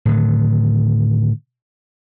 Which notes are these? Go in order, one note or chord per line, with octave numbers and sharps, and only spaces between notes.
A2 D3 D#3